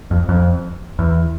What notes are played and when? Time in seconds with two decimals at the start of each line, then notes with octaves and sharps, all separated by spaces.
0.11 F2
0.29 F2
0.99 E2